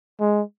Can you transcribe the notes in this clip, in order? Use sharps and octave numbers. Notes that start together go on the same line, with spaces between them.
G#3